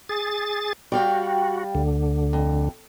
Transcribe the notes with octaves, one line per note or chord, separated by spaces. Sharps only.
G#4 A6
G3 F#4 F5 G5
D2 D3
F2